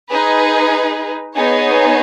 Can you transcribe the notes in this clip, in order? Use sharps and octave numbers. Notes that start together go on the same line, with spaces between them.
D#4 G#4 B4
B3 D#4 G#4 C#5